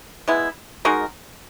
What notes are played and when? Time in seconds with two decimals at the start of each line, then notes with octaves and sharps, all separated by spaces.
0.28 G#3 B3 E4
0.85 G#3 D#4 F#4 A#4